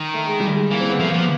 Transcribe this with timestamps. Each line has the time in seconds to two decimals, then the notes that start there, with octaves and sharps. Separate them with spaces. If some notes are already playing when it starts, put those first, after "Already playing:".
Already playing: D#3
0.14 A3
0.27 G#3
0.40 G3
0.53 G#3
0.71 E3 A#3
0.80 C4
0.90 B3
0.99 F3 A3
1.09 A#3
1.14 F3 B3